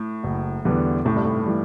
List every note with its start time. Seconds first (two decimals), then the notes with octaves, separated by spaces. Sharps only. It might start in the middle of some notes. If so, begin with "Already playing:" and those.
Already playing: A2
0.24 F#1
0.65 E2 D3 G3 B3
1.05 A2 C3
1.16 G2
1.25 A2
1.46 E3 G3